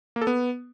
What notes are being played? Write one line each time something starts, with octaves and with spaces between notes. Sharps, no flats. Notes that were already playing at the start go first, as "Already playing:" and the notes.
A#3
A4
B3